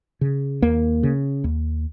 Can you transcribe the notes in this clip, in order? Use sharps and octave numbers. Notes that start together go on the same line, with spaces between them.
C#3
D#2 A#3
C#3
D#2